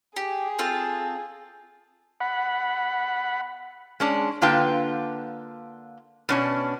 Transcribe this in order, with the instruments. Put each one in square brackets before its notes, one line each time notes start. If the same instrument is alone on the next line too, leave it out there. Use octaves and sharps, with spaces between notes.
[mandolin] G4 [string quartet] G#4
[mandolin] C4 F4 A4
[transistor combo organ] F#5 B5
[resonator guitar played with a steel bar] G#3 C#4 D4
D3 A#3 D4 F4 B4 G5
B2 C#4 D4